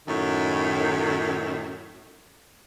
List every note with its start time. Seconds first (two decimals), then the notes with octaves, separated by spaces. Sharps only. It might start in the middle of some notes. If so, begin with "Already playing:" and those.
0.06 F#2 A2 D#3